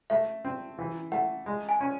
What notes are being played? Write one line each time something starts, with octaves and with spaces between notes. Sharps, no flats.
A3 E5
C4
E3
A3 F#5
G#3
G#5
C#4